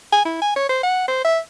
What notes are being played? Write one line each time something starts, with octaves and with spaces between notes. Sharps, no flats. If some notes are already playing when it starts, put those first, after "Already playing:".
G#5
E4
G#5
C#5
C5
F#5
C5
E5